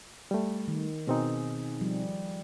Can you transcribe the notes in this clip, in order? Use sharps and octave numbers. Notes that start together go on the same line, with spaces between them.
G3 A3
D#3
B2 C4 D#4 G#4
F3 G3